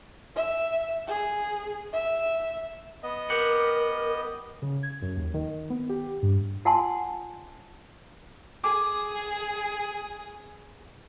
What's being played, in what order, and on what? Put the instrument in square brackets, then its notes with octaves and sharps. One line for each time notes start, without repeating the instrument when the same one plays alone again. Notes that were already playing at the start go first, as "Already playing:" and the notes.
[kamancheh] E5
G#4
E5
[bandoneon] B3 D#5
[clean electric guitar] G4 F#5 [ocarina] A#4
[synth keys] C#3
G#6
F#2
D#2
D#3
B3
G4
G2
[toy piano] F4 F#5 G#5 A5 C6
[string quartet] G#4 [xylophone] D6